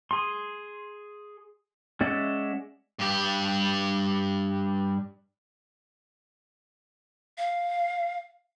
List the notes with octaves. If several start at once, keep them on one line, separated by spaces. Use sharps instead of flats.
G#4 C6
G#3 C#4 D5 E5 F#5
G2 G4
F5